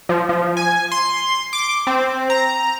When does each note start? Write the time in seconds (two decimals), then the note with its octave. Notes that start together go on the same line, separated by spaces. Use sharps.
0.09 F3
0.29 F3
0.57 G#5
0.92 C6
1.53 D6
1.87 C4
2.30 A#5